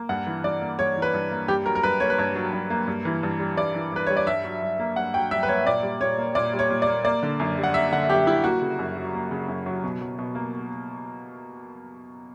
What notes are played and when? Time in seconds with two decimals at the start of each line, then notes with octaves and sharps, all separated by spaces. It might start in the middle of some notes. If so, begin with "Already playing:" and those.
Already playing: A#3
0.09 G2 F#5
0.27 E3
0.44 G2 D5
0.61 A#3
0.79 G2 C#5
0.96 E3
1.02 B4
1.14 G2
1.31 A#3
1.48 G2 G4
1.65 F#3 A#4
1.75 A#4
1.83 G2 B4
2.00 A#3 C#5
2.10 B4
2.18 G2 C#5
2.35 F#3
2.53 G2
2.70 A#3
2.88 G2
3.05 E3
3.23 G2
3.40 G3
3.57 G2 D5
3.74 E3
3.92 G2 B4
4.07 G3 C#5
4.17 D5
4.27 G2 E5
4.44 F#3
4.62 G2
4.79 A#3
4.96 G2 F#5
5.14 F#3 G5
5.31 G2 E5
5.43 B4
5.49 A#3 C#5
5.66 A#2 D5
5.83 G3
6.01 A#2 C#5
6.18 A#3
6.35 A#2 D5
6.53 G3
6.59 C#5
6.70 A#2
6.82 D5
6.87 A#3
7.05 A#3 D5
7.23 D3
7.40 F#2
7.58 G3
7.63 F#5
7.74 A#3 E5
7.92 D3 F#5
8.09 F#2 G4
8.27 G3 E4
8.44 A#3 F#4
8.61 C#3
8.79 F#2
8.97 F#3
9.14 A#3
9.31 C#3
9.48 F#2
9.66 F#3
9.84 B2
10.01 F#3
10.19 B2
10.35 A#3